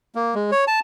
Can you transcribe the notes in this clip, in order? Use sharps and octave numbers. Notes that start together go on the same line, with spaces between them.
A#3
G#3
C#5
A5